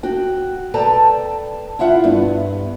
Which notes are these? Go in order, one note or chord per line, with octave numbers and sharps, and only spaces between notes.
F#4 G5
A4 B4 D5 G5 A5 A#5
E4 F4 E5 F#5
G2 B3